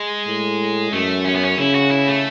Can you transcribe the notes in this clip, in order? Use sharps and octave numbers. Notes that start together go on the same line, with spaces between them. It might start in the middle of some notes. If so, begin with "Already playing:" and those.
Already playing: G#3
A2
F#2 A3
C#4
B3
C#4
C#3 E4
F#4
E4
A3